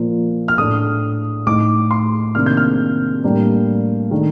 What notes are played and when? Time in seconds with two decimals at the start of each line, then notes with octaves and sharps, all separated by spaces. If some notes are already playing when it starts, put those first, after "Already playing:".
Already playing: A#2 F3 A#3
0.48 F6
0.58 A2 A3 D4 D#6
1.47 A2 A3 D#4 D6
1.91 C6
2.35 C3 D#3 A#3 D4 F6
2.46 G6
2.57 F6
3.24 A2 G3 A#3 D4
4.11 D#3 A3 D4